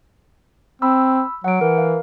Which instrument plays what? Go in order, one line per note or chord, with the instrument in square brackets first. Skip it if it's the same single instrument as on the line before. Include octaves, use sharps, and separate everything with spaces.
[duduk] C4 [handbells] B5 E6
[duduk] F#3 [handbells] F#5 D7
[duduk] E3 [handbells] A#4
[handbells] F5